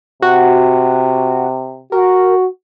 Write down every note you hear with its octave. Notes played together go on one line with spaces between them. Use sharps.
C3 F#4
F#4 A#4